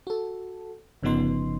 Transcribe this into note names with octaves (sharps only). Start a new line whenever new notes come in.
F#4 A4
G1 C#3 F3 B3 D#4 C6